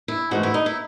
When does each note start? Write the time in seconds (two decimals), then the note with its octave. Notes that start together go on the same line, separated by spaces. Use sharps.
0.08 E4
0.31 G#2 E3 A3 F#4
0.43 E4
0.54 D#4
0.66 E4